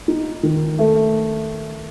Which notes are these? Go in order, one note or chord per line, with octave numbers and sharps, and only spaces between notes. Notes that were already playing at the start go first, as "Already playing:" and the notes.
D#4
D#3
A3